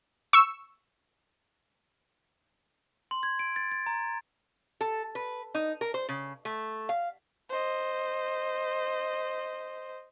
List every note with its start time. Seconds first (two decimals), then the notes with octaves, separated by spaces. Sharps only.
0.33 C#6 E6
3.11 C6
3.23 G#6
3.39 D7
3.56 A6
3.72 A6
3.86 A#5
4.81 A4
5.15 B4
5.55 D#4
5.81 A#4
5.94 C5
6.09 C#3
6.45 A3
6.89 F5
7.50 C5 D#5